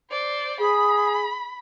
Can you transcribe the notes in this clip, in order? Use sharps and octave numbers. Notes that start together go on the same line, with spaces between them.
C5 D5
G#4 B5